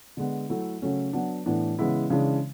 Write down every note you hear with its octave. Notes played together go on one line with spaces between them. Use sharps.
D3 G#3 B3
F#3 A3 E4
C#3 F#3 A3 C#4
F#3 B3 D4
A2 E3 B3 D4
C#3 E3 G#3 B3 E4
C#3 E3 G#3 D4